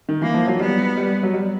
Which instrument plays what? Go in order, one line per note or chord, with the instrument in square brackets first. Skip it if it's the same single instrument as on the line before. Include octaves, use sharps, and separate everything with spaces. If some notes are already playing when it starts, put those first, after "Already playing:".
[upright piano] D#3
[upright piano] E3 [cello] A#3
[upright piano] F3
F#3
[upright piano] G3 [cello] B3
[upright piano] G3
F#3
G3